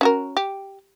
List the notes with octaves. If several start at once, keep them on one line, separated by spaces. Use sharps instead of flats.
C#4 F#4 A#4
G4